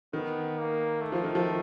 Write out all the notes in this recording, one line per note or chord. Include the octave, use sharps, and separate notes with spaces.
D#3 B3
A#3
A3
F3
D#3
F3